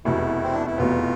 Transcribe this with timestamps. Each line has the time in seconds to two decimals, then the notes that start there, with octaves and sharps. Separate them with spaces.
0.05 F1 E2 B2 B3 E4
0.43 C4
0.54 D4
0.67 E4
0.78 F1 E2 B2 B3 F4